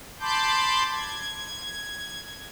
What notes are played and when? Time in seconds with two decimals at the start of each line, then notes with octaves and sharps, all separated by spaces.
0.20 A5 B5 C6 D6 G6
0.92 G#6